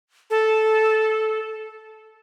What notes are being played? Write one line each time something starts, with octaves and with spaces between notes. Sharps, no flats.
A4